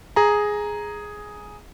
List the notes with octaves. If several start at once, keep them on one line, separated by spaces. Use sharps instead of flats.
G#4 A#5